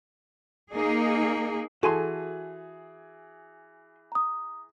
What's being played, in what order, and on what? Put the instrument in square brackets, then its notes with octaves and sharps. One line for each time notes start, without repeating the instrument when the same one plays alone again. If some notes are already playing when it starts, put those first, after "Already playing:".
[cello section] A#3 D#4 G#4
[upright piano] E3 G#4 [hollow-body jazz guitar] F#4 G#5 C6 [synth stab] A4
[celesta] A#5 D#6